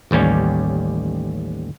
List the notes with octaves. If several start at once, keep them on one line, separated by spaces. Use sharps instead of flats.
A1 D#2 G3 C#4